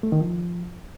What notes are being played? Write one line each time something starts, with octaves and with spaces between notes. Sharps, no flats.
A3
D#3
F3